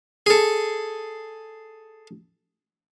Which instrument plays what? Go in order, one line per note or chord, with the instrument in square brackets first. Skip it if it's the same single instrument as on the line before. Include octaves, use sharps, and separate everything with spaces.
[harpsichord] G#4 A4